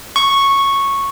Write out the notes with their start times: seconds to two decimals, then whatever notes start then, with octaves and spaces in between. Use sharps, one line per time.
0.16 C#6